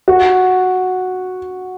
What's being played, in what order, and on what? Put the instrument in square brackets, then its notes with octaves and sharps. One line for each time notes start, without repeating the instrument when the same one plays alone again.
[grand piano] F#4